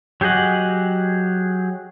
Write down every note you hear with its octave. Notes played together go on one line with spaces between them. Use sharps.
F#3 G4 G#4 D#5 F#5